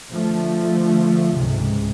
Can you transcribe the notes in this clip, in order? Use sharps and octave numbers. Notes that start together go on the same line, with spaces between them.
D3 F3 A3
C#2 G#2 C3